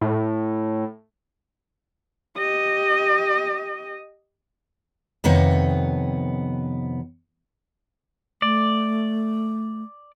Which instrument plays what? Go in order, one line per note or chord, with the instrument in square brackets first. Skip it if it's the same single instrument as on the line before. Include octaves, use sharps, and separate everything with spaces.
[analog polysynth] A2
[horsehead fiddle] G4 D#5
[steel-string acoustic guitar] F2 C3 D#3 B3 C#5
[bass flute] A3 [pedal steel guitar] D5